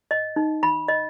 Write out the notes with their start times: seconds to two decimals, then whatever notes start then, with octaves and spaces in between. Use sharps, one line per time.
0.11 D#5
0.36 D#4
0.63 B5
0.88 D#5